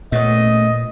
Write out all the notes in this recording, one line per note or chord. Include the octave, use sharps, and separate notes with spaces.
A#2 A3 B3 C#4 D#5